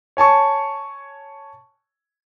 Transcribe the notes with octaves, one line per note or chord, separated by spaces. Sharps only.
C#5 G#5 A5 C#6